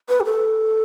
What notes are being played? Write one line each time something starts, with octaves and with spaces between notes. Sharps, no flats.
B4
G4
A4